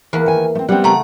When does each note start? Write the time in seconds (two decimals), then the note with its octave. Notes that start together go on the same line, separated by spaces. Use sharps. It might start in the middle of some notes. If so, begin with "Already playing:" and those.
0.13 E2 A#3 B4
0.26 D#3 G#5
0.55 A3 C4
0.69 G3 B3 C4 F#5
0.84 C#3 A3 F#5 A#5